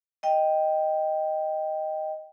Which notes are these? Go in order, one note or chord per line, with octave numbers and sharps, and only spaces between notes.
D#5 G5